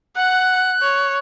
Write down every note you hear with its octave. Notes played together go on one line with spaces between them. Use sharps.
F#5 F#6
C#5